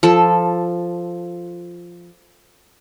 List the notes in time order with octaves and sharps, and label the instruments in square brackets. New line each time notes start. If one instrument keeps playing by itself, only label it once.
[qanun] F3 A4